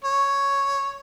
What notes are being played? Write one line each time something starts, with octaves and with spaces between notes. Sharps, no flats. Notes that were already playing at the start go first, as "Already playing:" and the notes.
C#5